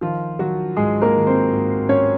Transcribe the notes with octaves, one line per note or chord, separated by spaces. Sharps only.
D#3 F3 F4
D#3 F#3 F#4
G#2 G#3 G#4
A#3 A#4
D#3
C4 C5
G#2
G#2 C#4 C#5